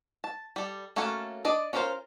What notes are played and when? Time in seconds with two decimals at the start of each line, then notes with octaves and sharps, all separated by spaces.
0.24 A5
0.56 G3 A4
0.96 A3 A#3 C#4 F#4 A4
1.45 D4 D5 D#5
1.73 C#4 D4 F4 A#4 C5